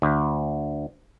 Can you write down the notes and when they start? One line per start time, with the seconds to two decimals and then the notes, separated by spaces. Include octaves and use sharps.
0.02 D2